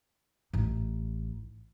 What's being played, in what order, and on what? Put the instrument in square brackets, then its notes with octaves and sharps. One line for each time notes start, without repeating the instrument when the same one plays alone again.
[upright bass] A1 D#4